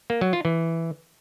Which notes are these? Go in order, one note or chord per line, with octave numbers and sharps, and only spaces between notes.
A#3
F#3
F4
E3